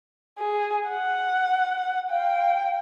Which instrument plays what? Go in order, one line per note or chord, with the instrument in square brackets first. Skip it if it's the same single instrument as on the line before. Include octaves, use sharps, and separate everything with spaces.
[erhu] G#4
F#5
[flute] F5 [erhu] G5